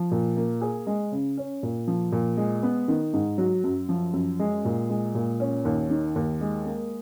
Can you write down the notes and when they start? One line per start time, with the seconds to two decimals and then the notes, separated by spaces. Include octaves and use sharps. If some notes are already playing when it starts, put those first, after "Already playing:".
Already playing: F3
0.11 A#2
0.37 A#3
0.61 G#4
0.87 G#3
1.12 C#3
1.37 C#4
1.63 A#2
1.87 F3
2.12 A#2
2.37 G#3
2.63 B3
2.88 D#3
3.13 G#2
3.38 F#3
3.64 F#2
3.89 F3
4.14 F#2
4.39 G#3
4.65 A#2
4.90 G#3
5.15 A#2
5.40 C#4
5.65 D#2
5.90 D#3
6.16 D#2
6.41 G#3
6.66 A#3